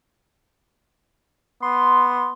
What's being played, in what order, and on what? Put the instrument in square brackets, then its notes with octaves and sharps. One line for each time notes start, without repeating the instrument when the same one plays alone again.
[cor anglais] B3 [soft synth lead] C6